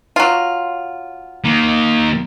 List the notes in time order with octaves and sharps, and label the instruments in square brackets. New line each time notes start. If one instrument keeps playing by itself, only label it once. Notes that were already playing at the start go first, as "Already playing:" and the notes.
[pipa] F#3 F4
[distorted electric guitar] D#3 A#3